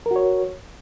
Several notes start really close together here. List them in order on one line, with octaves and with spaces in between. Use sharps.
A#4 F#4 C#5